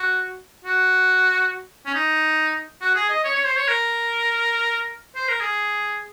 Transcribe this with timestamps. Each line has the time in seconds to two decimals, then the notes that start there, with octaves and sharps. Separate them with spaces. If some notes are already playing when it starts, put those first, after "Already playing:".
Already playing: F#4
0.65 F#4
1.86 C#4
1.94 D#4
2.81 F#4
2.95 G#4
3.10 D#5
3.24 C#5
3.35 C#5
3.46 C5
3.57 C#5
3.68 A#4
5.16 C5
5.28 A#4
5.41 G#4